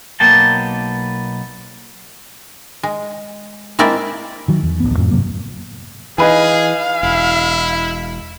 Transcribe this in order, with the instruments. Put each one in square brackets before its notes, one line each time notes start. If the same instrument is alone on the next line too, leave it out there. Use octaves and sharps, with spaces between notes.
[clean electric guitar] B1 B2 A#3 B3 G5 A5
[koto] G#3
G#3 A#3 C4 E4 D5
[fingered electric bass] D#3 F#3
E2
D1 A1 B3
F2 A2
G2 C3 F#3 A#3
[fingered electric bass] E3 [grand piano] D#4 B4 G#5 [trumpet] G#4 [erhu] F5
[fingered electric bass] E1 [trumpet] E4